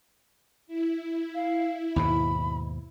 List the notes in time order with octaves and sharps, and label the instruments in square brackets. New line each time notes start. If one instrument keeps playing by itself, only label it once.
[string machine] E4
[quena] F5
[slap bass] D#2 G#2 B2 [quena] B5